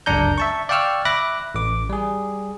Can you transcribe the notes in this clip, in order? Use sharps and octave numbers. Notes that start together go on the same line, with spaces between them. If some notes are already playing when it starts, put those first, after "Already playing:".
G1 C#2 F#2 D4 A#5 G6
E5 A5 C#6
D5 F5 G5 C#6 E6 F6
E5 B5 D6 F#6 A#6
A1 D6
G3 G#4